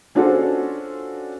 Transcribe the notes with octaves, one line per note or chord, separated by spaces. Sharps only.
C#4 D4 F4 F#4 A4 C5